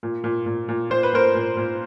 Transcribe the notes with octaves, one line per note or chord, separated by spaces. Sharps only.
A#2
A#2
A#2
A#2
A#2 C5
B4
A#2 A#4 C5
A#2
A#2